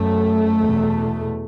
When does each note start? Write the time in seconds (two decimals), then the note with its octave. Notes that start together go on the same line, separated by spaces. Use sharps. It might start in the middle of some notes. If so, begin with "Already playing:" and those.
Already playing: F#2 A3
0.61 E2 B2